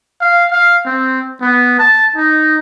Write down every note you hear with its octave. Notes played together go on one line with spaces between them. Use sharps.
F5
F5
C4
B3
A5
D#4